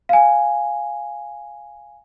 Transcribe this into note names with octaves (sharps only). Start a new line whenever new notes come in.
F5 G#5